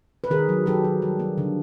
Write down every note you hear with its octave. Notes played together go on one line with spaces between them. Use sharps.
B4
D#3 G#4 A#4
F#3
F#3 G4 A4
F#3
G3
A#3
D3